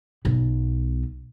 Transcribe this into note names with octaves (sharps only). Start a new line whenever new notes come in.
B1 B3